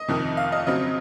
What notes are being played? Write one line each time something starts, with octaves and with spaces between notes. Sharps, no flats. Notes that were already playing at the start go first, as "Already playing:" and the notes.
Already playing: D#5
F2 C3 D#3
F5
D#5
C#3 F#3 C4 D#5